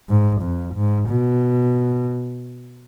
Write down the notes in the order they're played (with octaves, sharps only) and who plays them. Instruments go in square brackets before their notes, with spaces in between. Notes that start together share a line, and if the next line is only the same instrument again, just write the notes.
[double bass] G#2
F2
G#2
B2